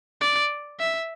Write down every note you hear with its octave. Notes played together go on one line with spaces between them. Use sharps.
D5
E5